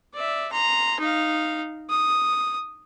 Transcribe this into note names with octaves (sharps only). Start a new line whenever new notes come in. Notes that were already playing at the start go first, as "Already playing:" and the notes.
D5 E5
A#5 C6
D#4 F5
D#6